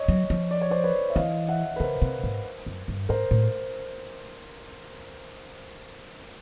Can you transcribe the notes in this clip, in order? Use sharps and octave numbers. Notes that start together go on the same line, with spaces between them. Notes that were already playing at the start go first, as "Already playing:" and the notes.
Already playing: C#5 D#5
F#3
F3
D5
C#5
C5 D5
B4 C#5
E5
E3 D#5 F5
E5 F#5
B4
C#3 A#4 C5
C3
G#2
F#2
G2
G#2 A#4 C5
A2